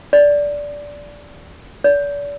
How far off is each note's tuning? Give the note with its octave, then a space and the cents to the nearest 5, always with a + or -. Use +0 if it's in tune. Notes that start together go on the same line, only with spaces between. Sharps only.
D5 -10
D5 -40